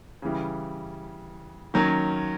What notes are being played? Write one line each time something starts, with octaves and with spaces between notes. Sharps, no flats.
C#3 E3 G3
D#3 F#3 A#3 C#4